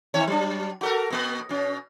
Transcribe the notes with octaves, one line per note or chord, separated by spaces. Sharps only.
D#3 C4 C#5
F#3 D4
F#4 A4 A#4
B2 A#3
B2 C#4